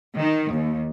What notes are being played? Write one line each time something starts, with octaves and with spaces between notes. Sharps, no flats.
D#3
D#2